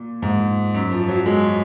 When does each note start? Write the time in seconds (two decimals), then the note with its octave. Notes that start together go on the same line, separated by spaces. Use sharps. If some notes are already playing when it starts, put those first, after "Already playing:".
Already playing: A#2
0.22 G#2
0.75 F#2
0.92 F3
1.08 F#3
1.26 G#3